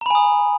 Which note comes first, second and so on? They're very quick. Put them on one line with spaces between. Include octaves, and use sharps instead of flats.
A#5 B5 G#5 D#6